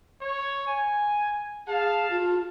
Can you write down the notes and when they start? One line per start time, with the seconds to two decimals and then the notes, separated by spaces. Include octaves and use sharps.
0.21 C#5
0.67 G#5
1.68 G#4 F5 A5
2.11 F4